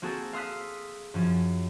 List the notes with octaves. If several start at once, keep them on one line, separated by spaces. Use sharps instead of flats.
A#3 C4 F#4 G#4 A4
F5 C6 D#6 E6 F#6 B6
F#2 F3 C#4